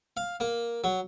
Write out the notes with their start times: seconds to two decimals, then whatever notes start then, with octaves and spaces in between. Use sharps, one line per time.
0.17 F5
0.40 A#3
0.84 F#3